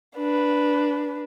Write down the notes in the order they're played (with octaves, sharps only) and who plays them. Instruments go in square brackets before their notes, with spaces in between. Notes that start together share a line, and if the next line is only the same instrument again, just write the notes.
[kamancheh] D4 B4